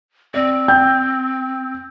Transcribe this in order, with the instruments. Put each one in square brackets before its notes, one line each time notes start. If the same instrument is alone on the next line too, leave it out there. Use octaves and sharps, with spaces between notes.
[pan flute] C4 [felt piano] D5
[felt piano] G5 G6